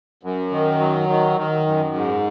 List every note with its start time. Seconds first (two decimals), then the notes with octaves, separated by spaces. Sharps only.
0.23 F#2
0.51 D#3
0.80 F#3
1.09 D#3
1.37 D#3
1.67 F#2
1.95 G#2